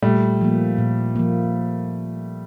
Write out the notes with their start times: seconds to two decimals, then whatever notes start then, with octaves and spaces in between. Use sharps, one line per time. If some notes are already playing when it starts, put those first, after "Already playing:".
0.02 A#2 G3 A3
0.41 F3 A#3
0.78 A#2
1.16 F3 A#3